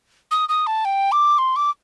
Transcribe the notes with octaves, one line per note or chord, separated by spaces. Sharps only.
D#6
D#6
A5
G5
D6
C6
D6